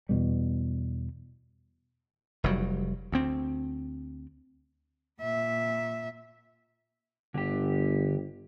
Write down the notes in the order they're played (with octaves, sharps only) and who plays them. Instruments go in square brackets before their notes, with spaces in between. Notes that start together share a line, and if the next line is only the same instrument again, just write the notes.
[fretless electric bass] E2 B2 G3
[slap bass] F1 F#3 G3
D2 C4
[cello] A#2 E5
[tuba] G1 [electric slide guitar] D3 G4